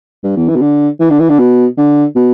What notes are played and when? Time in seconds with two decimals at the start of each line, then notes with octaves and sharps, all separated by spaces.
0.23 G2
0.37 E2
0.49 E3
0.56 B2
0.61 D3
1.00 E3
1.10 D3
1.20 E3
1.29 D3
1.39 B2
1.78 D3
2.16 B2